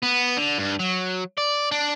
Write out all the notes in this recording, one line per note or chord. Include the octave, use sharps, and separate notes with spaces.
B3
D3
G2
F#3
D5
D4